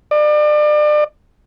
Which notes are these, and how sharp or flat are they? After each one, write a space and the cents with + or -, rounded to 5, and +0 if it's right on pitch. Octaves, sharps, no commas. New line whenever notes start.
D5 +35